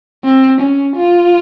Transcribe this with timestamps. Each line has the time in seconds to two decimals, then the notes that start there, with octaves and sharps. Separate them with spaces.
0.25 C4
0.61 C#4
0.97 F4